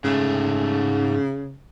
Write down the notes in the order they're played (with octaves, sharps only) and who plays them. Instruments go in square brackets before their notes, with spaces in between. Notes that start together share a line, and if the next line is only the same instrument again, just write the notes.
[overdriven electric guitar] G#2 A3 [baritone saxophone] C#3